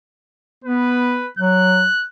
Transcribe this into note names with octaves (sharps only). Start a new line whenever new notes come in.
B3 B4
F#3 F#6